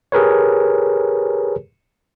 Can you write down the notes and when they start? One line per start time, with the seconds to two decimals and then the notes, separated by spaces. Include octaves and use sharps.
0.12 G4 G#4 A#4 B4 C#5